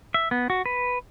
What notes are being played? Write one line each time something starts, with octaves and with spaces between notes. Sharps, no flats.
E5
B3
F#4
B4